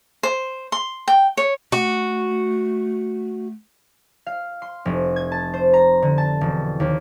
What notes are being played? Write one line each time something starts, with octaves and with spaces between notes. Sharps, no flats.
C5
C6
G5
C#5
A3 F#4
F5
C6
F1
G#6
A5
C5
A#5
D3
A5
E1
D#2